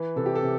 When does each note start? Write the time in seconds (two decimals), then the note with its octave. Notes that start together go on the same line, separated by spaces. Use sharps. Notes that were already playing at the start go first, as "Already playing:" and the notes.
Already playing: E3 B4
0.16 C3 A4
0.26 G4
0.35 A4
0.43 C3